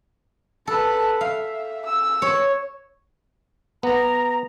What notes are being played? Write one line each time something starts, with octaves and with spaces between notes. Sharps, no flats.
A4 B4 A5
E5 F5
E6
C#5
B3 A#5